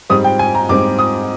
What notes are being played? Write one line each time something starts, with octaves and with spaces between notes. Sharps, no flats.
G#2 G3 C4 D#6
G5
G#5
A#5
G#2 G3 C4 D6
D#6